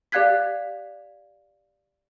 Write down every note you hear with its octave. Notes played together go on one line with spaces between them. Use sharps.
G4 D5 F5 F#6 G#6 B6